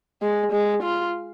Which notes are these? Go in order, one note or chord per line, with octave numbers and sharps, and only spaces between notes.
G#3
G#3
F4